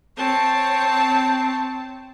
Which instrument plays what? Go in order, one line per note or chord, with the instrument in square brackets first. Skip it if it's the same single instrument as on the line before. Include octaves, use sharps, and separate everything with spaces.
[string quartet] C4 C#5 A5